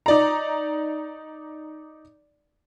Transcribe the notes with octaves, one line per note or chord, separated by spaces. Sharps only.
D#4 D5 A#5